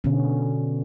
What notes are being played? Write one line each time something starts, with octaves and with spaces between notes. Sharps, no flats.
B2 D3 B3 C#4